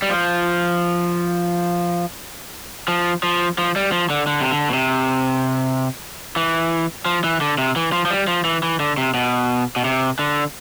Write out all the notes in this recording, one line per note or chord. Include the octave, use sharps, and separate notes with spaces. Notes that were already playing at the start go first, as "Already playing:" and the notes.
G3
F3
F3
F3
F3
G3
F3
D3
D3
C3
D3
B2
C3
E3
F3
E3
D3
C3
E3
F3
F3
G3
F3
E3
E3
D3
C3
B2
B2
C3
D3